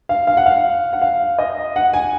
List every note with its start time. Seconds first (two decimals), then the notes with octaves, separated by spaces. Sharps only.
0.09 F5
0.27 F5
0.37 F#5
0.46 F5
0.93 F#5
1.01 F5
1.39 D#5
1.76 F#5
1.93 G#5